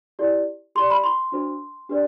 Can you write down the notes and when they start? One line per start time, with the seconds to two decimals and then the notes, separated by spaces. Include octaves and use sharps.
0.19 E4 G4 D5
0.75 G4 D5 C6
0.90 B5
1.04 C6
1.32 D4 F#4 C5
1.89 D4 G4 B4 D5